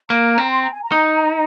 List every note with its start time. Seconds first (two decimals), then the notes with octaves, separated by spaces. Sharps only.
0.10 A#3 A#5
0.38 C4
0.51 C6
0.62 A#5
0.72 G#5
0.83 A#5
0.92 D#4